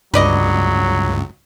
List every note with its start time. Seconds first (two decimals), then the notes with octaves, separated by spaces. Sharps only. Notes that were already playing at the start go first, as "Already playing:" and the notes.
0.14 C#2 G2 F#3 B4 D5 D#5